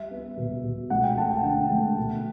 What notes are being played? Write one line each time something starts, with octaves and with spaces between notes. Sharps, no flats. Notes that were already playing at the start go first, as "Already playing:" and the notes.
Already playing: G3 E5
B3
B2
B2
A3 F#5
G5
A3 A5
G5
D3 G5
A3
B2